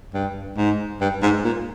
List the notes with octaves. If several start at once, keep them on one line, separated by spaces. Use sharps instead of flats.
G2
G#2
G2
G#2
A#2